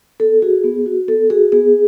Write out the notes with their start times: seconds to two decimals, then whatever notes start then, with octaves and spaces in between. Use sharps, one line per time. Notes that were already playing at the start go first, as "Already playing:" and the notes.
0.20 B3 A4
0.42 F#4 G#4
0.64 B3
0.86 F#4
1.08 B3 A4
1.30 F#4 G#4
1.52 B3 G#4